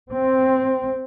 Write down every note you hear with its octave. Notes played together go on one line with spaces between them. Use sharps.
C4